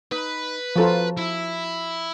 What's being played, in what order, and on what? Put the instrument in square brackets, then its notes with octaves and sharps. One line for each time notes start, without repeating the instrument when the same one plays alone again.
[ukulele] D#4 [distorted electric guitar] B4
[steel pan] F3 F4 [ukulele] F#4 A4 A#5
[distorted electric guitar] E4